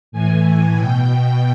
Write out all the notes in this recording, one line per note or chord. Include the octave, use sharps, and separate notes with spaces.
A2 E3 G#5
B2 G5